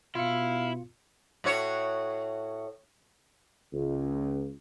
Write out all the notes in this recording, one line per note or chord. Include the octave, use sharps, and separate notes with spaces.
B2 E4 F4 F5 C#7
A2 F#4 C#5
C#2